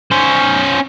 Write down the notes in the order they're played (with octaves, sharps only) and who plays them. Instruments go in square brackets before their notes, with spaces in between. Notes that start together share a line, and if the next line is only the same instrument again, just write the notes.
[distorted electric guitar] C#4 C5